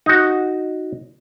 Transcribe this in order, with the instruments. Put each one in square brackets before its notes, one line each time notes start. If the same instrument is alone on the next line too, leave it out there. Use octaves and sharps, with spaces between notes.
[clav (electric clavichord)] D#4 F#4